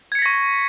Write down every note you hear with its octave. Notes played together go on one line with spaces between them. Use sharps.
C#6 G#6 A#6 B6 C#7